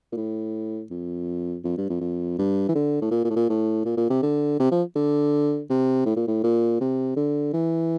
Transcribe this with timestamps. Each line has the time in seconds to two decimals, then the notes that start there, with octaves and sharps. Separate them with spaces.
0.13 A#2
0.17 A2
0.91 F2
1.65 F2
1.77 G2
1.90 F2
2.01 F2
2.39 G2
2.69 E3
2.75 D3
3.02 A2
3.11 A#2
3.25 A#2
3.30 A2
3.36 A#2
3.49 A2
3.85 A#2
3.97 A#2
4.10 C3
4.23 D3
4.60 C3
4.72 F3
4.96 D3
5.70 C3
6.06 A2
6.17 A#2
6.28 A2
6.44 A#2
6.81 C3
7.17 D3
7.54 E3